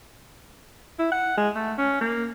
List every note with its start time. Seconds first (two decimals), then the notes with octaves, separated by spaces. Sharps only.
0.99 E4
1.12 F#5
1.37 G#3
1.55 A3
1.78 C#4
2.01 A#3